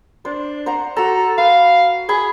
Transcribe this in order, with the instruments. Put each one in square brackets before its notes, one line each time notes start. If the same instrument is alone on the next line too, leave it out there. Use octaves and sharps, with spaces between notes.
[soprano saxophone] D4 [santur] C5
[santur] C5 F#5 A#5
[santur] F#4 A#5 [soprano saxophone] A4
[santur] B4 [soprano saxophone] F5
[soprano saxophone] G#4 [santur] G#5 B5